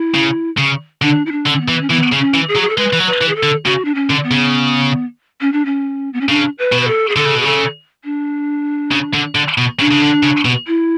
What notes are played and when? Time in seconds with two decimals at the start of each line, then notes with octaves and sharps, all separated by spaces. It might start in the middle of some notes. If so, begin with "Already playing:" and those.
Already playing: E4
0.14 C#3
0.58 C#3
1.02 D3 D4
1.26 E4
1.32 D4
1.46 D3
1.52 C#4
1.61 B3
1.68 E3
1.81 C#4
1.90 E3 B3
2.12 C#3
2.19 C#4
2.34 E3
2.48 G#4
2.56 F#3
2.62 G#4
2.69 A4
2.78 G#3 B4
2.93 E3
3.00 F#3
3.07 B4
3.22 E3
3.29 G#4
3.36 A4
3.43 D3
3.65 C#3 F#4
3.85 D4
3.95 C#4
4.10 D3
4.23 B3
4.31 C#3
5.41 C#4
5.52 D4
5.65 C#4
6.13 B3
6.21 C#4
6.29 C#3 D4
6.58 B4
6.72 B2
6.81 B4
6.87 A4
7.09 G#4
7.16 D3 A4
7.26 C#3
7.35 B2
7.41 G#4
7.45 C#3 A4
8.04 D4
8.92 C#3
9.14 D3
9.35 D3
9.58 B2
9.79 C#3 D4
9.91 C#3
10.02 D3
10.23 C#3
10.45 B2
10.67 E4